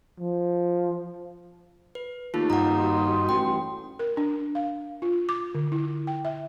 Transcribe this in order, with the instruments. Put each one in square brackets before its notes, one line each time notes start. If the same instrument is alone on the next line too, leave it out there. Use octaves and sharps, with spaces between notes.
[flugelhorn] F3
[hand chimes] B4
[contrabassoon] D#2 [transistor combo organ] A3 [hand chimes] D#4 F4
[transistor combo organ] G2 D#4 [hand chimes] F#5 A#5
[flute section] F#4 C6
[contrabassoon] A1 [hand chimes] G5
[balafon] A#4
D4
F5
F4
D6
D3
E4
G5
E5